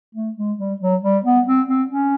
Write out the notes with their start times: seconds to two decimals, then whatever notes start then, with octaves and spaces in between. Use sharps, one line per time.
0.15 A3
0.37 G#3
0.58 G3
0.80 F#3
1.03 G3
1.25 B3
1.47 C4
1.68 C4
1.91 C#4